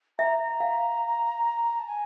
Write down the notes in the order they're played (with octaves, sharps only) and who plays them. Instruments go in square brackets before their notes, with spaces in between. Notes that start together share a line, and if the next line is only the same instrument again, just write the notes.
[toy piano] E5 [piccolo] A#5
[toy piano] F5
[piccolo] A5
G#5